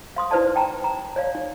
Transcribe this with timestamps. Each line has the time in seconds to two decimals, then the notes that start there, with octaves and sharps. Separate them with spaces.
0.16 F5 C6 D#6
0.31 D#4 E4 B4 C5 D5 A5
0.56 G5 A5 A#5
0.84 A#5
1.16 C#5 D5 F5
1.35 D#4